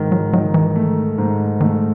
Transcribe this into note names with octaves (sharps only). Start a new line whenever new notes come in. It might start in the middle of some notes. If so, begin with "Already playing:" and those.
Already playing: G#2 D#3
F#3
D#3 F#3
E3
A3
G#2
D#3 A3